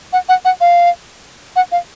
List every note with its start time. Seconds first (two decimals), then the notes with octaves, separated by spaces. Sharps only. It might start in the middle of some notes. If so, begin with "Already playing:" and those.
0.13 F#5
0.29 F#5
0.45 F#5
0.61 F5
1.56 F#5
1.72 F5